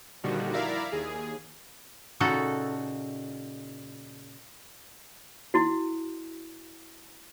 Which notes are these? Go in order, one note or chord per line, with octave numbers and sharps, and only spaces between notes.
A#2 D3 D#3 F3 G3 F#4
E4 A#4 D5 E5 F5 A#5
D#2 G#4
A#2 C#3 D#4 F#4 A4
E4 F#4